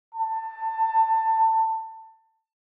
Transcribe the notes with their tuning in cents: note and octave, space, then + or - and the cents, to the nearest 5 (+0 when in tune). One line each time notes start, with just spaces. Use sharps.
A5 +20